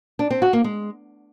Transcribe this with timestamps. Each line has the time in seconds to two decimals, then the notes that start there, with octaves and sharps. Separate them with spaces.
0.19 D4
0.30 C4
0.42 F#4
0.53 A#3
0.64 G#3